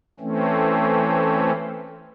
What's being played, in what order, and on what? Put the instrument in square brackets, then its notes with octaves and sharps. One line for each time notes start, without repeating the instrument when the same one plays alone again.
[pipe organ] E3 A3 C4 C#4